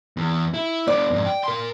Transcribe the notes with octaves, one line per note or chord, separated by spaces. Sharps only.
E2
E4
B3 D4 D5
F2 G#2
G5
A#4 C6